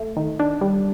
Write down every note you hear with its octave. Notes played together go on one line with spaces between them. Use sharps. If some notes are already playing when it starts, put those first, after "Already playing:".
Already playing: A3
D#3
D4
G3